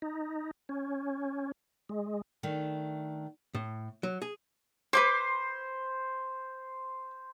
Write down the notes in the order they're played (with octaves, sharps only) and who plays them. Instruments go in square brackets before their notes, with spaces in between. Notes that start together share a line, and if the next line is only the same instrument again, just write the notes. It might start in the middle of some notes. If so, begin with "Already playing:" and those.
[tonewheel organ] D#4
C#4
G#3
[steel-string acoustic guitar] D#3 A3 D4
[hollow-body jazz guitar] A2
F#3
G#4
[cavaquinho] B4 C6 D6 [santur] C5